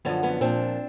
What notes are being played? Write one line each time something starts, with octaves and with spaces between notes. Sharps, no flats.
F#2 D3 F3 B3 C#4
B3 C#4
A#2 F3 C4 D4